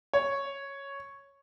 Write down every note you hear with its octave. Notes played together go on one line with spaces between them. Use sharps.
C#5